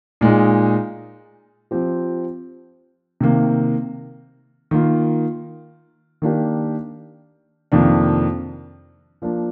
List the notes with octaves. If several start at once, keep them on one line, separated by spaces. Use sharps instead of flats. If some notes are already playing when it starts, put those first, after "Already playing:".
A#2 G#3 D#4
F3 C4 G4
C3 D#3 A#3
D#3 A#3 F4
D#3 A#3 D4 G4
F2 C3 D#3 A#3 D4
F3 A#3 D4